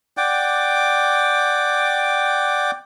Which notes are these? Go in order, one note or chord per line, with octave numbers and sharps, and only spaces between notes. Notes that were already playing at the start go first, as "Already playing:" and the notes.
D5 F#5 G5 D6